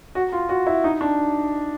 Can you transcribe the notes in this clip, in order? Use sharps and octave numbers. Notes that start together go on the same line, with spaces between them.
F#4
F4
F#4
E4
D#4
D4